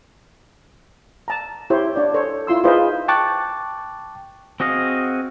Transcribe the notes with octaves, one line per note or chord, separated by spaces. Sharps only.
A5 A#5
E4 G4 C5 C#5
D4 C#5 D5
A4 C5 C#5
E4 F4 C6 E6
D#4 F4 G#4 B4 C5 D#5
G5 A5 C#6 D6 F#6 A6
C4 F#4 G#4 D#5 F5